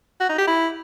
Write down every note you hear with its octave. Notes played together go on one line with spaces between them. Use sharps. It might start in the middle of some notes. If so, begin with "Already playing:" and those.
F#4
D#4
G4
E4